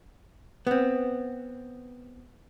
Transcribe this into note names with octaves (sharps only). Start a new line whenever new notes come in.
B3 C4